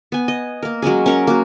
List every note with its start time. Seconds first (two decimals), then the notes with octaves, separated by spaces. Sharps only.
0.12 B3 G#5
0.28 D#5
0.63 A#3 A#4
0.82 F#3 G#3 C#4 G#4
1.06 C#4 A#4 C#6
1.27 A#3 F#4